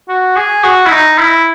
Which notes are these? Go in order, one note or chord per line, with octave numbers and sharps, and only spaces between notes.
F#4
G#4
F#4
E4
D#4
E4